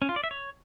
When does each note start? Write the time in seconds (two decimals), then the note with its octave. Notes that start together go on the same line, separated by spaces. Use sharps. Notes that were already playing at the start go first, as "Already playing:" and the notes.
0.02 C#4
0.09 F4
0.16 D5
0.24 E5
0.31 C#5